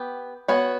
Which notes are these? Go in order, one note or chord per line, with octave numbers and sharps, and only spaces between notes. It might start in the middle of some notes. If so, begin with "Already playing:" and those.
Already playing: B3 G4
B3 F#4 C#5